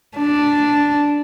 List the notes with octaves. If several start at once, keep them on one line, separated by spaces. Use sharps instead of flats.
D4